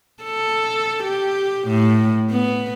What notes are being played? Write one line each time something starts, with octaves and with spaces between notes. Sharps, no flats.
A4
G4
A2
B3